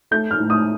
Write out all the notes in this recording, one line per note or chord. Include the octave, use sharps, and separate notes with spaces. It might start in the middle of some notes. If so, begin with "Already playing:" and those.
A3 G6
F6
A2
D#6